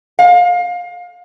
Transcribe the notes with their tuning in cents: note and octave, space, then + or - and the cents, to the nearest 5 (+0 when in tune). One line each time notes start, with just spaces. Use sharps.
F5 +25